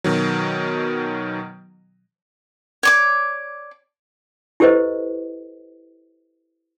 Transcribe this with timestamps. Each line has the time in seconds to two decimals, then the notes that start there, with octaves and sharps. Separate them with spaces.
0.04 B2 D#3 F#3
2.83 C#5 D5 D6
4.60 E4 G4 A4 B4 C5 D#5